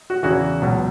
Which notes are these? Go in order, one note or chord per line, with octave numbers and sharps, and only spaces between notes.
F#4
E2 C#3 E3 F#4
C#2 B2 F#3